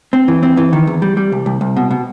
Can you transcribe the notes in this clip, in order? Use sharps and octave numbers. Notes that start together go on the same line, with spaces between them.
C4
E3
C4
E3
D#3
E2
G3
G3
C2
C2
C2
B2
B2